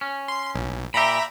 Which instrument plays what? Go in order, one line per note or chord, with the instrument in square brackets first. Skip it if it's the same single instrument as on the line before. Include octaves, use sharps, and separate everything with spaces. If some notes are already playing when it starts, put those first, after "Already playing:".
[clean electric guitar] C#4
[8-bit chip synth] C6
B1
[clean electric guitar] A#2 G4 [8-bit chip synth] E5 A#5 B5